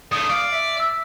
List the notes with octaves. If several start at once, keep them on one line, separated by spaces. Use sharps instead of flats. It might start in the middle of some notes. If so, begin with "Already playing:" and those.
G2 A3 D#6
D5 F5
E5
E6 B6